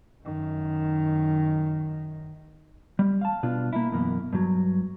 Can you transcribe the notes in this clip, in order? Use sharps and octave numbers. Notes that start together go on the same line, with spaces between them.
F#2 D#3
G3
F5 A5
B2 D4 F4
A#3 E4
F#2 B2 E3 A#3
G2 F#3